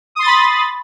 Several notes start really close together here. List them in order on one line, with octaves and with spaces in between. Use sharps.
D#6 C6 A6 B5